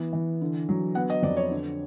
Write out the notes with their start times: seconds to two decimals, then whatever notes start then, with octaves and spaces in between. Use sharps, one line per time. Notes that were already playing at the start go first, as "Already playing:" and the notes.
Already playing: E3 B3
0.13 E3
0.41 D3
0.69 F#3
0.95 B3 F#5
1.10 D#5
1.23 F2 D5
1.37 C#5
1.51 D3